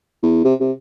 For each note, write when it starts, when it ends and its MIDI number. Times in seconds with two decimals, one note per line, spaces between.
0.23 0.41 40
0.44 0.54 48
0.60 0.71 48